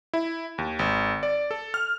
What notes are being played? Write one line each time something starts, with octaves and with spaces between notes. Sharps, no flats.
E4
D#2
G#1
D5
A4
F6